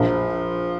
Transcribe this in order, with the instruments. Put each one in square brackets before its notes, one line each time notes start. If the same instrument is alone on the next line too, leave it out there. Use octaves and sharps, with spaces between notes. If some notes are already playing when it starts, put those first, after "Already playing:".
Already playing: [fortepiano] A#1 [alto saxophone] F3